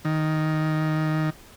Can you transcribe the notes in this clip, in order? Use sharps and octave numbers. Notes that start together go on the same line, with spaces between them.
D#3